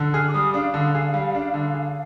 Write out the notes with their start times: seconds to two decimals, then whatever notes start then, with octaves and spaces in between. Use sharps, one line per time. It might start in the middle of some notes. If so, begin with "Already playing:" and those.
Already playing: D3
0.14 G#4 F6
0.28 D6
0.34 G3 D#6
0.54 D4 F5
0.74 D3
0.95 G#4
1.14 G3
1.34 D4
1.54 D3
1.74 G#4